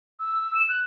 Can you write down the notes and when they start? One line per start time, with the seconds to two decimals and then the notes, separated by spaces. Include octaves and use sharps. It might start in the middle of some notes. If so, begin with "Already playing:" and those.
0.19 E6
0.55 E7
0.69 F#6